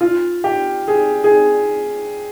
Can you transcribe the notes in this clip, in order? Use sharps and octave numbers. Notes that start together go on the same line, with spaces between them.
F4
G4
G#4
G#4